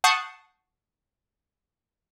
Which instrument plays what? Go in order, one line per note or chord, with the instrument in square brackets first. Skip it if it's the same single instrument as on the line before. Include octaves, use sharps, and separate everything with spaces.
[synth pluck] F#5 A5 C#6 D#6 G6 C7